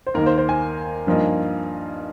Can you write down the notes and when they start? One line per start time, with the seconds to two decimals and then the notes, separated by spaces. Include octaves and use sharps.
0.07 C5
0.14 D#2 D#3 A#3 A#4
0.26 C5
0.38 C5
0.49 G#5
1.07 G2 F3 A#3 D#4